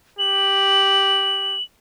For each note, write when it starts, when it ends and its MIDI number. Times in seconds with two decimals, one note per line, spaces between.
0.19 1.58 67
0.19 1.62 102